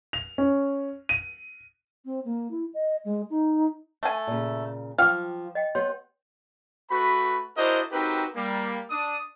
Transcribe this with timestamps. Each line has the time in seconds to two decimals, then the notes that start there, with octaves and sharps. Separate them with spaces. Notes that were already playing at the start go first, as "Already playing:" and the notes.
0.13 F7
0.38 C#4
1.09 D#7
2.05 C4
2.25 A#3
2.51 E4
2.74 D#5
3.05 G#3
3.30 D#4
4.03 A3 G#5
4.27 A#2 C#3
4.98 F3 F4 F5 G5 D6
5.55 D#5 G5
5.75 B3 G4 C#5 C6
6.91 A3 F#4 B4 B5
7.58 D4 E4 F#4 A#4 C5 D#5
7.92 C4 D#4 F#4 G4 A#4 B4
8.35 G3 A#3
8.91 D4 D#6